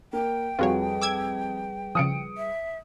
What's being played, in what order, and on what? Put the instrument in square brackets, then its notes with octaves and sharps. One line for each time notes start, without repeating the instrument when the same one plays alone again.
[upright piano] A#3 [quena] G5
[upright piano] F2 [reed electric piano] G3 G#4 B4 [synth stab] F4 F#4 C#5
[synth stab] D6 E6 G#6
[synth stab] C#3 F3 [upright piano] D#6 C#7 D7
[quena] E5